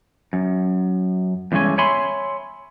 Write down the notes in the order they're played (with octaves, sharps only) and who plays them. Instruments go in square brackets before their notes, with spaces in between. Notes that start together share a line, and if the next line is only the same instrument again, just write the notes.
[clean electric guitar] F#2
E2 G2 D3 G#3 C#4 G#5
C#5 E5 G#5 B5 C6